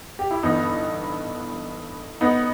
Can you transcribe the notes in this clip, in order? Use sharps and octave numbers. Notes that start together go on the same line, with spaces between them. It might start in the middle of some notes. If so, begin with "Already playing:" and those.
G4
E4
G1 G2 E3 B3 D#4
B3 D#4